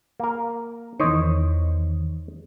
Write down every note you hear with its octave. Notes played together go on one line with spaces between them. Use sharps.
A#3 A#4
E2 D#3 C5 C#5 D#5